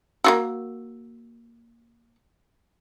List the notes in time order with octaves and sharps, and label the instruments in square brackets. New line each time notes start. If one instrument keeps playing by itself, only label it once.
[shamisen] A#3 F4 F#4 [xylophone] E6